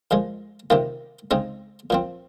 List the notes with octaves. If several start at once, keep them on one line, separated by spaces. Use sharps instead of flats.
A#2 F3 G#3
C3 D#3 A#3 F4
C#3 G#3 C4 D#4
A#2 F3 C4